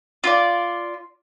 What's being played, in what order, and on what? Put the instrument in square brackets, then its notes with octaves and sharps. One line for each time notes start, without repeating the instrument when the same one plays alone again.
[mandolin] F4 D5